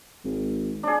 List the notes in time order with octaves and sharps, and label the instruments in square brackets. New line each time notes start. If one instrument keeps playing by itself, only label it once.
[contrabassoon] G#1
[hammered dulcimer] D4 G#4